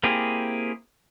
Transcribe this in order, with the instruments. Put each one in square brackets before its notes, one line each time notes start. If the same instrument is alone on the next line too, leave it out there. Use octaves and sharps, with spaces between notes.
[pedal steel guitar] A#3 C4 E4 G4 G#4